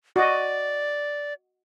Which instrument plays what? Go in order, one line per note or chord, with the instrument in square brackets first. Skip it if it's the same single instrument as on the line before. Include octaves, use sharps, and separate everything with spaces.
[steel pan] F#4 D#5 [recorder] D5